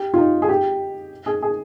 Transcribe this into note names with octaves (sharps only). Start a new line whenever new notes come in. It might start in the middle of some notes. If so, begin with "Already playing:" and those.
Already playing: G4
F4
D#4
G#4
G4
G#4
G#4